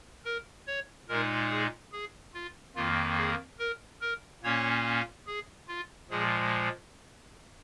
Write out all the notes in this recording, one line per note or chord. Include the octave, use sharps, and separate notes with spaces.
A#4
C#5
A#2 G#3 D#4 A#4
G#4
G#4
F4
F2 D#3 A#3 F4
G#4
A#4
A#4
A#2 A#3 C#4 C#5
G#4
F4
A#2 F3 G#3 G#4